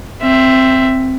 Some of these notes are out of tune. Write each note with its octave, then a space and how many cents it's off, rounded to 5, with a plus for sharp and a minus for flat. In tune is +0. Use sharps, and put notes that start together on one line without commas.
C4 +0 E5 +10